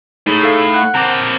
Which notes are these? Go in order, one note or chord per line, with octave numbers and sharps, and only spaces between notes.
A2 D#4 G#4
D#4 A4 F5
F#5 F#6
C4 A#4 A5 D6